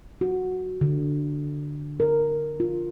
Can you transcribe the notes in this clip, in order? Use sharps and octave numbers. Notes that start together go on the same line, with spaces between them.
F#4
D3
A#4
F4